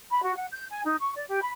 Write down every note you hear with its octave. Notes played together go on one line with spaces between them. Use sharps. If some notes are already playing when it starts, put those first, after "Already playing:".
B5
F#4
F#5
G6
G#5
D#4
C#6
D5
G4
B5